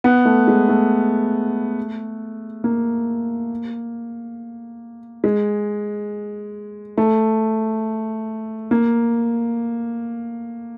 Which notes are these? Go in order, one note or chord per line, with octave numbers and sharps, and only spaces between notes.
B3
A3
G#3
A3
A#3
G#3
A3
A#3